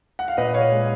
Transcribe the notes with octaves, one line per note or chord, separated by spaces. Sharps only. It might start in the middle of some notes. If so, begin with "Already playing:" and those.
F#5
F5
A#2 B4 D#5
C#5 F5
G#3